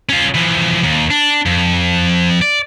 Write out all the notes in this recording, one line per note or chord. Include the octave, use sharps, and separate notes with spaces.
C#4 F4
E3 F3
D#2
D4
F2
D5